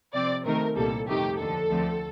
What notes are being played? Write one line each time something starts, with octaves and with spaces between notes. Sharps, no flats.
C3 F3 C4 D5
C3 D#3 A3 D#4 A#4
C2 A#2 G3 A#3 A4
F2 C3 D#3 A3 D#4 G4
D#2 D3 F3 A4
D2 D3 F3 A3 C4